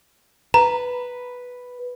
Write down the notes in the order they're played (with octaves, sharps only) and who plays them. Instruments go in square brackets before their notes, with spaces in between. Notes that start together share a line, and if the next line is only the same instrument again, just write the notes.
[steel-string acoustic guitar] B4 [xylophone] A#5